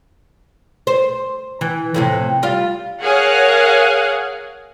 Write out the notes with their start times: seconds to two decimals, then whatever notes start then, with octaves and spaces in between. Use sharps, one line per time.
0.87 C5
1.61 E3
1.94 F2 A2 C3
2.43 G3 F4 F5
3.00 G#4 A#4 C#5 F5 F#5 G#5